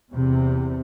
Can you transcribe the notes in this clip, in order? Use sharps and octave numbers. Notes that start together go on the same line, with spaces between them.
E2 C3